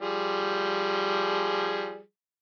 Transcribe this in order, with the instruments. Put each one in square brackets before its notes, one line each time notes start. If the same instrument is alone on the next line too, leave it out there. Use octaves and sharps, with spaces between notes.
[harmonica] F3 G3 G#4